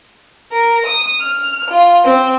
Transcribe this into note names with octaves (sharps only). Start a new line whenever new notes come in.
A#4
D#6
F6
F4
C4